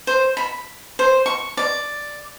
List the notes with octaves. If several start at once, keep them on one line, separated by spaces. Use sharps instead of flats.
C5
B5
C5
C#6
D5